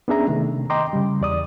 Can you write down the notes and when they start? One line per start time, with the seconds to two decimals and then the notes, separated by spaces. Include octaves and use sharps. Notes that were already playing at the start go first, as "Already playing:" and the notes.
0.08 B3 C#4 D4 G#4 E5 A#5
0.28 C3 D#3 A3
0.70 D#5 G5 A#5 C6 D6
0.93 C#3 G3
1.21 E2 D5 D#6